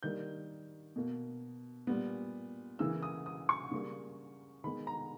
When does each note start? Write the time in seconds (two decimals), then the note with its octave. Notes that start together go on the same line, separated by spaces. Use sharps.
0.03 D#3 G3 A#3 G6
0.96 B2 A#3
1.87 A#2 G3 B3
2.79 C#3 E3 A#3 E6
3.03 D#6
3.26 D#6
3.49 C#6
3.72 C#3 G3 A#3
4.64 D#3 G#3 B3 B5
4.87 A#5